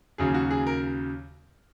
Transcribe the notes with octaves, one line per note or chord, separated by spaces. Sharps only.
D#2 C#3 F#3 G#4
F#4
G#4
A#4